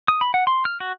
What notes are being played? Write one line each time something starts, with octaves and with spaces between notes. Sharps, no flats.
D#6
B5
F#5
C6
F6
F#4